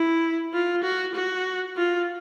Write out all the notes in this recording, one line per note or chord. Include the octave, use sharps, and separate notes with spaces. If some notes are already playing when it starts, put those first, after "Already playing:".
Already playing: E4
F4
F#4
F#4
F4